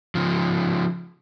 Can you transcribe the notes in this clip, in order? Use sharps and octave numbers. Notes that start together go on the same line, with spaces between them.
C#3 F3